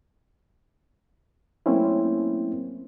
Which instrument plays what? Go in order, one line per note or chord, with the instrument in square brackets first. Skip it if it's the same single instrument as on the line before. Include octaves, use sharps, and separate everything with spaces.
[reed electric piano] F#3 A3 A#3 C4 C#4 E4